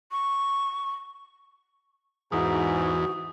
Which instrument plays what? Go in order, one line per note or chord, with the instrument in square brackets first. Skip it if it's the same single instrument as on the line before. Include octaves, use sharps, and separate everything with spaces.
[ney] C#6
[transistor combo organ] E2 [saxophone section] G#2 [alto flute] F#4 [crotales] D#6